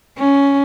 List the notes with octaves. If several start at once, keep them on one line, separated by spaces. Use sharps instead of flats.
C#4